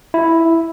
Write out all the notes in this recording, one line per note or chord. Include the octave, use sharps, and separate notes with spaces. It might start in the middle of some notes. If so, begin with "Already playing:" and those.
E4